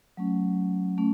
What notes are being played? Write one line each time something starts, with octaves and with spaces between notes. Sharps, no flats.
F#3 A3 C#4
A3 C#4